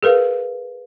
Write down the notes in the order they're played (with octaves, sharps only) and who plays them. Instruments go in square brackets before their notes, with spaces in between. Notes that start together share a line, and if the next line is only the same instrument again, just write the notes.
[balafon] G#4 A#4 B4 F5